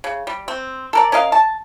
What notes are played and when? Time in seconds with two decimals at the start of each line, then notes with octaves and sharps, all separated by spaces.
0.04 C#3
0.27 G3
0.48 C4
0.93 A4 A#4 D5
1.12 C#4 A#4 D#5 F5
1.32 A5